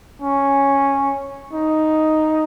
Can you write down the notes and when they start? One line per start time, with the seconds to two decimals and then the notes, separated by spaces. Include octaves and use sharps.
0.22 C#4
1.53 D#4